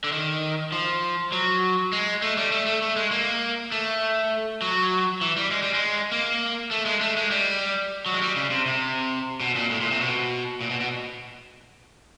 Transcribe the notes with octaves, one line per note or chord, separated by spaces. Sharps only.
D3
D#3
F3
F#3
G#3
A3
G3
A3
A3
A3
G#3
A#3
A3
F#3
E3
G3
G#3
G3
G#3
A#3
A3
G#3
A3
G#3
G3
F#3
G#3
G3
C#3
C3
C3
B2
A#2
A2
A#2
C3
B2
A#2
B2
B2